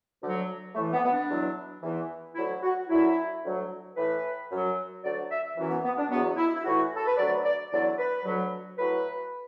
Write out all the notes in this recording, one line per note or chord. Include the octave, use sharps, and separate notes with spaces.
D2 D3 F#3
A2 E3 A3
B3
B3
D4
E2 B2 F#3
E2 E3
D2 D3 F#3 E4
F#4
F#2 D3 F#3 E4
D2 D3 F#3
A2 E3 B4
F#2 F#3
D2 D3 F#3 D5
E5
F#2 E3
B3
B3
D4
E2 B2 F#3 B3
E4
E4
A2 E3 F#4
A4
B4
D2 D3 F#3 D5
D5
E2 D3 F#3 D5
B4
D2 D3 F#3
A2 F#3 B4